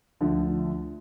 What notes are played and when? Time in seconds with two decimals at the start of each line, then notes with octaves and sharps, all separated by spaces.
0.21 D2 D3 F3